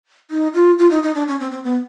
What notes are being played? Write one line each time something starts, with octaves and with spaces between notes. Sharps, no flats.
D#4
F4
F4
D#4
D#4
D4
C#4
C4
C4
B3